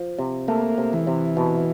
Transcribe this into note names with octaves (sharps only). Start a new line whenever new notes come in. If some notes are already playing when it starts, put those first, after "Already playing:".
Already playing: F3
C3
A3 A#3
C3
E3
C3
B2